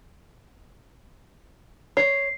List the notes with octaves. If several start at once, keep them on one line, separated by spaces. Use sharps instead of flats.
C#5 C7